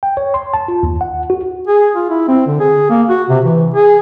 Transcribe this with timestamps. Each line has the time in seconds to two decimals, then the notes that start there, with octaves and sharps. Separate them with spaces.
0.03 G5
0.17 C#5
0.34 C6
0.54 A5
0.68 F4
0.83 D#2
1.01 F#5
1.30 F#4
1.67 G#4
1.96 F4
2.10 E4
2.28 C4
2.47 D3
2.60 G#4
2.90 A#3
3.09 F#4
3.29 C3
3.45 E3
3.74 G#4